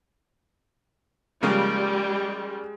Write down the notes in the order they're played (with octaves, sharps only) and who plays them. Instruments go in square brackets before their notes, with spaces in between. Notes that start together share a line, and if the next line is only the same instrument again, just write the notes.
[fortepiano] C#3 F3 A#3 [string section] G3 [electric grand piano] G#3